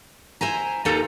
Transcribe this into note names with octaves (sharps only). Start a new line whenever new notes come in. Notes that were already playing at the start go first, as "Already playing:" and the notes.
E4 C5 G#5 A#5
D#2 D#4 F4 A4 A#5